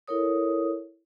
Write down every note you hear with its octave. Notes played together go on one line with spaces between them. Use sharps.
E4 A4 A#4 C#5 D#6